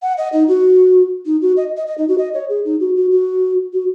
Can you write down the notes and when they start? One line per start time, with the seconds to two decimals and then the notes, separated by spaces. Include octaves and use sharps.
0.02 F#5
0.17 D#5
0.33 D#4
0.48 F#4
1.26 D#4
1.41 F#4
1.57 D#5
1.77 D#5
1.87 D#5
1.98 D#4
2.08 F#4
2.18 D#5
2.34 C#5
2.49 G#4
2.65 D#4
2.80 F#4
2.95 F#4
3.11 F#4
3.73 F#4